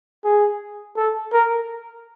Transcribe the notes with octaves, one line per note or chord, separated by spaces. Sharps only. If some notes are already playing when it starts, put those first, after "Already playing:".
G#4
A4
A#4